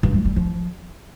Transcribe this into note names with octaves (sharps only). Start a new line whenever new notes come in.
G2
G3
G3
F3